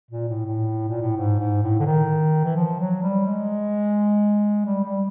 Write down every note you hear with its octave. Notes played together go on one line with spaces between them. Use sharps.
A#2
A2
A2
A#2
A2
G#2
G#2
A2
D3
D#3
E3
F3
F#3
G3
G#3
G3
G3